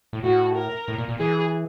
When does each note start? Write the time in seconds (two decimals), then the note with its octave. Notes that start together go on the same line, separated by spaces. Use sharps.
0.13 A2
0.24 A2 F#4
0.56 A#4
0.88 A2
0.98 A#2
1.09 A#2
1.20 E3 G#4